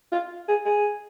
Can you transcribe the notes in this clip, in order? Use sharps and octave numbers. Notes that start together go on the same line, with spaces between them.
F4
G#4
G#4